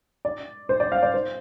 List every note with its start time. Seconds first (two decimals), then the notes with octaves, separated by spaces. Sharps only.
0.25 D5
0.69 C5
0.80 D5
0.92 F5
1.03 D5
1.14 C5